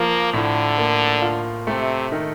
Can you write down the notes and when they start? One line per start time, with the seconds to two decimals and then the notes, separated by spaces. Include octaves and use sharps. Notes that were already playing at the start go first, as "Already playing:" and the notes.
Already playing: F3 A#3
0.33 A2 D3
0.78 A#3
1.22 F4
1.67 C3 A3
2.12 D#3